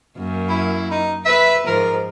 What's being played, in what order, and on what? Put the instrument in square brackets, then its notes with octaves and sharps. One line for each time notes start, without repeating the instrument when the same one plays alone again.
[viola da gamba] F#2 A#3
[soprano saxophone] E4
D#4
[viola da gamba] B4 [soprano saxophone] E5
[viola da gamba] G#2 F3 [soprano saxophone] A#4